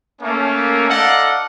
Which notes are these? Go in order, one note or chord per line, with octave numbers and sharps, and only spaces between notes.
A3 A#3 C#4
D#4 A4 D5 D#5 F5 F#5